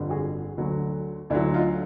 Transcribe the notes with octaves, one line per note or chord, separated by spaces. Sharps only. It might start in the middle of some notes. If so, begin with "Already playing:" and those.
Already playing: G1 F2 D3 G3
F#4 G#4
D2 D3 F#3
D2 D3 F#3 D4 E4
D#4 F4